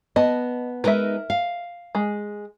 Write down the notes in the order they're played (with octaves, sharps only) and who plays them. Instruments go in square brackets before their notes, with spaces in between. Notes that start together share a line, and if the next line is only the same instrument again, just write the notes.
[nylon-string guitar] B3 A5 [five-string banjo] D#5
[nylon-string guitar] G#3 D#4 B4 [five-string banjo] A#4 E5
[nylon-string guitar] F5
[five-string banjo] G#3